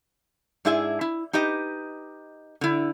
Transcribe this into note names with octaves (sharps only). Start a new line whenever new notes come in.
G#2 D4 E4 G#4 E5 G#5
E4
D#4 G4 B4 D#5
D3 E4